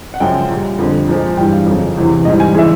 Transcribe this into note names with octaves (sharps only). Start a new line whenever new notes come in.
F#5
F#2 C#3 F3 G#3 G5
A#2 G3
F2 D3 G3
A#2 F3 G#3
G2 E3 G3 G5
F5
F2 C#3 F#3
E2 C3 E3
G#2 E3 G3 D#5
G#5
C#3 E3 G#3 E5